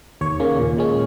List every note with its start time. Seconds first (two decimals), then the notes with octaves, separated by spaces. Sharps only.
0.21 D#2 C#5
0.40 C#3 A#3 C#4
0.59 A#2
0.78 G#3 C#4